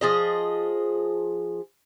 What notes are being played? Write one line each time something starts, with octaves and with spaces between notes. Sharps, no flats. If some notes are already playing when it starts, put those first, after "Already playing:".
F3 G#4 D#5